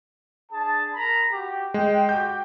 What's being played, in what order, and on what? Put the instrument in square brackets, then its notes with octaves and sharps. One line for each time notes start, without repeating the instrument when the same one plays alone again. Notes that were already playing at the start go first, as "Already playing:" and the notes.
[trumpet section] D4 G#4 A5
A#4 A#5 B5
F#4 G4
[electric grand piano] G#3 [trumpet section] G5
[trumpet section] F#4 G4 [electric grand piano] G5 G6